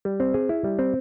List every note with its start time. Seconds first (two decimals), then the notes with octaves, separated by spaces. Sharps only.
0.05 G3
0.20 C4
0.34 G#4
0.49 E4
0.64 G3
0.79 C4